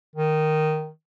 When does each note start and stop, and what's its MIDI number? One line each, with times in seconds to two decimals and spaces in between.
0.16 0.89 51